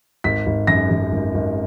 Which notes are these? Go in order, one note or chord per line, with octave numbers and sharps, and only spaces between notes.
G#1 B6
G#1
F#2 A#6
F#2
G#1
G#1